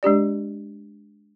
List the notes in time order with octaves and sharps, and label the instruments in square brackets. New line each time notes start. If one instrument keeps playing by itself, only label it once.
[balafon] G#3 D4 G4 D5